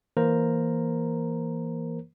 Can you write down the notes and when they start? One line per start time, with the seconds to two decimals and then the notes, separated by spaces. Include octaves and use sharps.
0.17 E3 A#3 A#4 C5 A#5